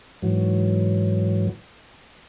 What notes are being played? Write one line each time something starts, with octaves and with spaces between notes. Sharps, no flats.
G#2 E3 F#3